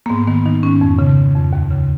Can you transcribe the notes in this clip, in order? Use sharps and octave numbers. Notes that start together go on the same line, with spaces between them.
A#3
G#2 B3
D#3 B3
D#3 D#4
G#2 C#4
F2
C#3
C#3
F2
D#2
C#3